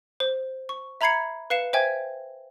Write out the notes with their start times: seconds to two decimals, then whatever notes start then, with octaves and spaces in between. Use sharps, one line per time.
0.20 C5
0.69 C#6
1.01 E5 A#5 B5 G#6 C7 C#7
1.50 B4 F5 C7 C#7 E7
1.73 C5 E5 G5 G#5 G#6